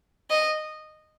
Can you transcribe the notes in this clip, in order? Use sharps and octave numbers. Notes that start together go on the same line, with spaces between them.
D#5